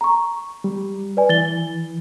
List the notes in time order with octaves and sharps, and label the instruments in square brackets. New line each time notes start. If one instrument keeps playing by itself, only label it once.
[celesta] A#5 C#6
[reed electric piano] G3
[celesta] B4 D5 G#5
[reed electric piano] E3 [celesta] A6 G7